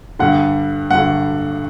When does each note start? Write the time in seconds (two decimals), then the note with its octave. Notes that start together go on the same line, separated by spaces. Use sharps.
0.19 G2 D3 F#5
0.91 G2 D3 F#5